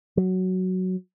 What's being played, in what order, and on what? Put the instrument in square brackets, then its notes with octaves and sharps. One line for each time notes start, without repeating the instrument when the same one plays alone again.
[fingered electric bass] F#3